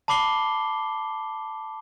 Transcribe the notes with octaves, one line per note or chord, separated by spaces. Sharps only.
A5 B5 D6 C7 G7